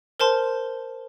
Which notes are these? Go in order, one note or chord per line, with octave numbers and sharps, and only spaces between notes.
A#4 C5 A5 C6